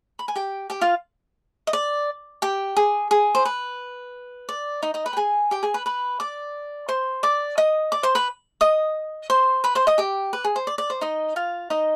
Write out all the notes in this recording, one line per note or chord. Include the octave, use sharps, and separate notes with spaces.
B5
G#5
G4 G5
G4 G5
F4 F5
D#5
D5
G4 G5
G#4
G#4
C5
B4
D5
D#4 D#5
D#4 D#5
B4 B5
G5
G#4 G#5
G4 G5
G#4 G#5
B4 B5
B4 B5
D5 D6
C5 C6
D5 D6
D#5 D#6
D5 D6
C5 C6
B4 B5
D#5 D#6
C5 C6
B4 B5
C5 C6
D#5 D#6
G4 G5
B4
G#4
C5
D5
D5
C5
D#4 D#5
F4 F5
D#4 D#5